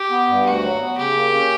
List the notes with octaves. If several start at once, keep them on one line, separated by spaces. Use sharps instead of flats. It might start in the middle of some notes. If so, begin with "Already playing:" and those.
Already playing: G4
B3
G2
D2 F#4
F#3
B3
C#3 G4
A#3
C#4